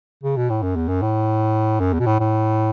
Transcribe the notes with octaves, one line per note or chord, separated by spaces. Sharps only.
C#3
B2
A2
F#2
E2
F#2
A2
F#2
E2
B2
A2
A2